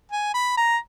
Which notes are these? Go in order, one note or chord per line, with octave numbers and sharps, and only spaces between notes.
G#5
B5
A#5